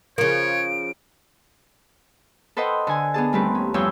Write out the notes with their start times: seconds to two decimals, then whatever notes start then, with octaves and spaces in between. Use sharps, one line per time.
0.18 C#3 F3 A#4 C#5 D7
2.57 A4 B4 C5 D#5 F#5 G5
2.87 D3 G#5
3.14 B3 D4 G#4 A5
3.33 D#2 G3 A3 C4 B4
3.55 C#4
3.74 E2 G2 F3 C#5 G5 E6